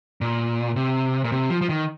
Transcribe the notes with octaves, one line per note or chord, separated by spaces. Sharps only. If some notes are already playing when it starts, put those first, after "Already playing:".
A#2
C3
A#2
C3
F3
F3
D#3